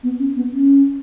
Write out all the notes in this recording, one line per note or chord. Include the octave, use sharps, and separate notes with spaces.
B3
C#4
B3
C#4